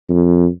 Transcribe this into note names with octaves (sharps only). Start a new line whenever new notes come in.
F2